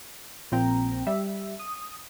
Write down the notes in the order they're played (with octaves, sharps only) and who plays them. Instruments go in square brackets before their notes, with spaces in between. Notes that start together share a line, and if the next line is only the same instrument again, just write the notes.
[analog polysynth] A#1 A#2 C4 G5 A#5
G3 E5
D#6